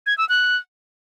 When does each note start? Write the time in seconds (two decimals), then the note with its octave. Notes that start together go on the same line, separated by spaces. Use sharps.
0.06 G#6
0.18 E6
0.29 F#6